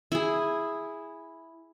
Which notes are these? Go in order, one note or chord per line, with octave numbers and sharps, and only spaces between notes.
E4 G#4